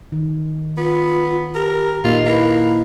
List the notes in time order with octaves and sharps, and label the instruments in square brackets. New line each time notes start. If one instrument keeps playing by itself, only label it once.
[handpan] D#3
[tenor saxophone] B3 [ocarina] F4
[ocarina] G4 [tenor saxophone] A#4
[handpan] A#2 A#3 D#4 [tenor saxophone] F4
[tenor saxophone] A#3 [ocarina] E4 [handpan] B4